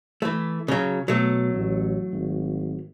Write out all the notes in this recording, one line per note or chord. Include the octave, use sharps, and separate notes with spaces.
E3 A3
C#3 F#3
B2 F#3 A3
A1
G#1